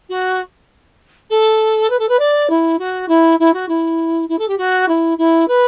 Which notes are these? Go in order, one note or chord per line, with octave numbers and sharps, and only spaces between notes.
F#4
A4
B4
A4
B4
D5
E4
F#4
E4
E4
F#4
E4
E4
A4
G4
F#4
E4
E4
B4